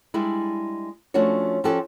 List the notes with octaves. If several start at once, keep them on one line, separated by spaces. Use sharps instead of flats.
G3 G#3 D4 E4
F3 A3 C#4 D4 F#4 C#5
F3 C#4 F#4 G4 A4